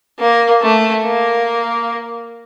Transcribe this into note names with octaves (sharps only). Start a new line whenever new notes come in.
A#3
A3
A#3